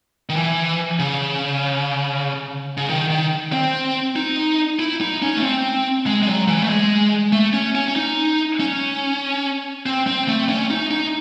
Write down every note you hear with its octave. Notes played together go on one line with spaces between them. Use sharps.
D#3
E3
C#3
C#3
D#3
D#3
C4
D#4
E4
D#4
C#4
A3
C4
G#3
G#3
F#3
E3
A3
G#3
A3
C#4
C#4
C#4
D#4
C#4
C4
C4
A3
C#4
D#4
D#4